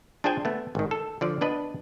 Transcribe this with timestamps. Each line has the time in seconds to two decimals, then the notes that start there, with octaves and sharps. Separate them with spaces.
0.24 D4 F4 G#4 C5 G5 G#5
0.45 A3 B3
0.75 G#1 D#3
0.91 A4
1.21 D3 F3 D5
1.41 B3 D4 B4 D#5